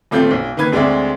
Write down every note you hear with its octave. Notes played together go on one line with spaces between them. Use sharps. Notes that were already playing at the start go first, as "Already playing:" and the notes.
D#1 A3 C4 F4 G6
B1
D#3 A#3 B4 G#6
D2 G#3 C4 D5 E5